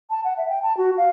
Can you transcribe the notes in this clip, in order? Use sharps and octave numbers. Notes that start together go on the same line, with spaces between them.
A5
F#5
E5
G5
A5
F#4
F5